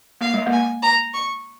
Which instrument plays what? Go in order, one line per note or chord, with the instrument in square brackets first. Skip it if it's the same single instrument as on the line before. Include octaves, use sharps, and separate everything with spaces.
[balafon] A#3 [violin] F5
[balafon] G#3
A#3
[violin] G#5
A#5
C#6